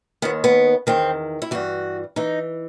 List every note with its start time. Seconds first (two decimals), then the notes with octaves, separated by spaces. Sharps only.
0.22 D#2 D#3 B3
0.44 B3
0.87 E2 D#3 C4
1.42 E4
1.51 G2 E3 F#4
2.16 E3 D#4